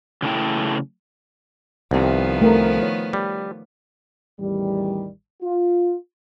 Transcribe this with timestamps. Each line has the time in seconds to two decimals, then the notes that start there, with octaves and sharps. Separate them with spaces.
0.22 C#3 E3 F#3 A3 E4 G5
1.91 C2 C3 D#3 F3 B3
2.41 A3 A#4
2.83 C#5
3.13 G3
4.40 A1 E2 D#3 G3
5.42 F4